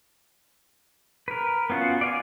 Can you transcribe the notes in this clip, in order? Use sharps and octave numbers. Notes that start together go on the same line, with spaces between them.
A#4 B4
B3 C#4 F4 F#4 F#5
D5 F5 G#5